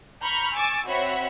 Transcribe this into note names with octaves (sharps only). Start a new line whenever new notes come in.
A#5 B5 C#6 F6 G6
G#5 C#6 D6 E6 A6
C4 F#4 C#5 E5 F#5 B5